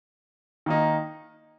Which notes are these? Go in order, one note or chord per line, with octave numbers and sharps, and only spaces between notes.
D#3 A#3 D#4